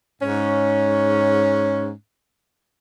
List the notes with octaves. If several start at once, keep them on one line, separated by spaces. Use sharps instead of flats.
G#2 C#4